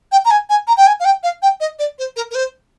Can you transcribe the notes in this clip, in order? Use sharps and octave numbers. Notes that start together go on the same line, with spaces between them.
G5
A#5
G#5
G#5
A#5
G5
G#5
F5
G5
F5
G5
D#5
D5
C5
A#4
A#4
C5